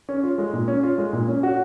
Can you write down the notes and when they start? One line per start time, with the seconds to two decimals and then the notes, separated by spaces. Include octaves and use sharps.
0.09 C#4
0.23 F4
0.38 G#3
0.53 A#2
0.68 C#4
0.83 F4
0.98 G#3
1.13 A#2
1.28 C#4
1.43 F#4